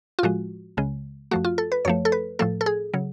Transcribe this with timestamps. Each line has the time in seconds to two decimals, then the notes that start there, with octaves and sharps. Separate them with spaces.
0.19 F4
0.23 A2 F3 G#3 F#4
0.77 C#2 C#3 G#3
1.31 F#2 F3 A3 F#4
1.44 F4
1.58 A4
1.72 B4
1.85 F#2 F3 A3 C#5
2.05 A4
2.12 B4
2.39 A2 F3 A3 A4
2.61 A4
2.66 G#4
2.94 C#3 F#3